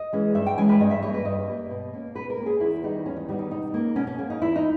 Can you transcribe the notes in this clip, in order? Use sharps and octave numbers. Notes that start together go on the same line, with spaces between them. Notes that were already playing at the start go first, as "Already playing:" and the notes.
Already playing: D#5
E3 G#3 C#4
G2 E5
G5
E3 G#3 C#4 G#5
B4
G2 D#5
E5
G3 A#3 C#5
B4
G2 D#5
G3 A#3
B2
A#3 C#4
B2 B4
A#4
A#3
C#4 G#4
E2 E4
D#3 G3 B3 D#4
E2 C#4
D#4
D#3 G3 B3 D#4
D#4
B2 D#4
A#3 C#4
B2 C#4
C#4
A#3 C#4
D#4
E2 E4
D#4